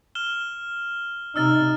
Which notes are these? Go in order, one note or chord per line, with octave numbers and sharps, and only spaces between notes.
F6 E7 G7
C3 D#4 E6 F6 A6